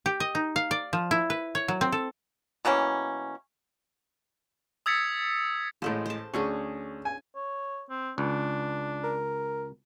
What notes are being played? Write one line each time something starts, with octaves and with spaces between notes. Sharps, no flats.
G4
D#5
D#4
F5
D5
F3
E4
B4
C#5
F#3
C4
A4
B2 E3 A#3 C#4
D#6 E6 G#6 A6 B6 C#7
A1 A2 G#3 A4 C5
C5 A5
D2 C#4 D4 G#4 C#6
G#5
C#5
C4
C#2 D4
A#4